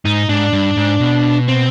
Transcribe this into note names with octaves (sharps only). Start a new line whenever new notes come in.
G#2 D#4
G#2 D4
G2
G#2
B2
C4